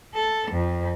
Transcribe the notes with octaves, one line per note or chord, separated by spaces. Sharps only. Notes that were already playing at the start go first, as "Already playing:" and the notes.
A4
F2